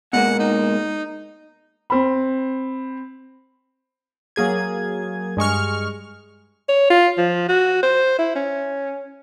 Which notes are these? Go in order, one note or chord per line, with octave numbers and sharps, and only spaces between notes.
B2 G#3 A#3 F#5
D#4
C4 B5
F#3 A#3 G#4 G#6
G2 G#3 C#6 F6
C#5
F4
F3
F#4
C5
E4
C#4